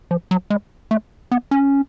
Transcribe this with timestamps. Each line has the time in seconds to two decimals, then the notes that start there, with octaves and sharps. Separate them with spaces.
0.11 F3
0.31 F#3
0.50 G#3
0.91 A3
1.31 B3
1.51 C#4